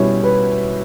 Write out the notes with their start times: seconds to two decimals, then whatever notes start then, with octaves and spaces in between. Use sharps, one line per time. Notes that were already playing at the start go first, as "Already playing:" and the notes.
Already playing: B2 G3 C#4 E4 C#5
0.23 B4